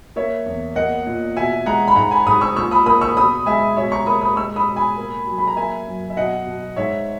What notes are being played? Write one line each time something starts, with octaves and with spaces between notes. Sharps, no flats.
A#3 C#5 E5
E2
A#3 D#5 F#5
A#2
B2 E5 G#5
G#3 F#5 A#5
B5
G#2 F#5 A#5
G#5 B5
G#2 B5 D#6
C#6 E6
A#2 C#6 E6
B5 D#6
A#3 B5 D#6
C#6 E6
B2 B5 D#6
G#3 E5 G#5
B2 C#5 E5
A#5 C#6
A#3 B5 D#6
B5 D#6
G#3 C#6 E6
B5 D#6
B2
G#5 B5
A#3
F#3
B5
A#5
A#3 E5 G#5
F#2
E5
B2 D#5 F#5
B2
G#2 C#5 E5